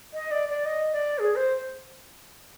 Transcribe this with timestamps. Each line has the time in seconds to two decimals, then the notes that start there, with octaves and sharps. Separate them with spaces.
0.14 D#5
0.31 D5
0.49 D5
0.66 D#5
0.93 D5
1.19 G#4
1.36 C5